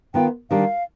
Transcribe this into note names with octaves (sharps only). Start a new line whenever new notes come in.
D#3 B3 F4 G5
D#3 G3 D4 G4 F5